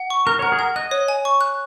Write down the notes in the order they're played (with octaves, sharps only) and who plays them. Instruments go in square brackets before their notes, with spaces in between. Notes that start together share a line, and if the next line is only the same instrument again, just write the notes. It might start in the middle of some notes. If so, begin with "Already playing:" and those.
Already playing: [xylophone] F#5
C#6
[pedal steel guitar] A#4 [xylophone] F#6
[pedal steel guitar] C#5
[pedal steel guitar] A#4 [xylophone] F#5
[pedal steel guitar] G#4
[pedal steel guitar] A#4 [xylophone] F#5
[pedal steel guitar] D#5 [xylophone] F#6
[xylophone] C#5
G#5
C#6
F#6